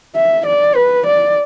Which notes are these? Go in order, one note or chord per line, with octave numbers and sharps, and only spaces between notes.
E5
D5
B4
D5